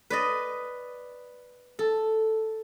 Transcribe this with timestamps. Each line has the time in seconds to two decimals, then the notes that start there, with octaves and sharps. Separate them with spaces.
0.10 B4 D5 D#5
1.79 A4